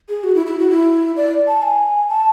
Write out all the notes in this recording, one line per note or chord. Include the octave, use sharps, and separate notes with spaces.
G#4
F#4
E4
E4
F#4
E4
D5
A5
G#5
A5